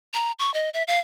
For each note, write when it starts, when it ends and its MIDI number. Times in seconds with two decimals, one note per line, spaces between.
0.14 0.32 82
0.39 0.53 85
0.54 0.70 75
0.74 0.83 76
0.88 0.99 77